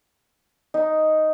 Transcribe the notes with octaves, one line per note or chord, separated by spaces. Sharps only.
D#4